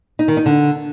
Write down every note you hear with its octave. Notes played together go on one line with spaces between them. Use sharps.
D#4
D#3
D#4
D3